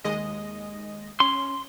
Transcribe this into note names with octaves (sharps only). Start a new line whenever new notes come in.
D#2 G#3 D#5
C#4 C6